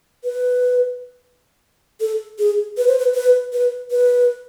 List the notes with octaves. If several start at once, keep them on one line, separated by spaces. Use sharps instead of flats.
B4
A4
G#4
B4
C5
B4
B4
B4
B4